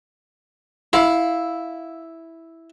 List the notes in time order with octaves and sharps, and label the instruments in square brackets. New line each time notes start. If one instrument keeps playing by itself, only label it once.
[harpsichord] E4 [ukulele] F5 B5